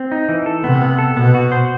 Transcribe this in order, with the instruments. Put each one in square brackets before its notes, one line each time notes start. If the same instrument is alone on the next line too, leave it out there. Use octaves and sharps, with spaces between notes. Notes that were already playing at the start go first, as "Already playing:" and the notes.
Already playing: [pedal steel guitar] C4
D#4
E3
A4
[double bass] C3 [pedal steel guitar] B3
[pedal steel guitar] B3
A4
[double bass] B2 [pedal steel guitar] B3
[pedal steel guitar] F#4
C5